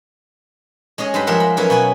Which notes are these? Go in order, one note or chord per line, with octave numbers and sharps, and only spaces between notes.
G#3 C#4 G#4 D#5
G2 C5 B5
F3 G#3 A#4 E5 F#5
B5
F#3 A#3 C#4 A#4 B4
B2 F#5 G#5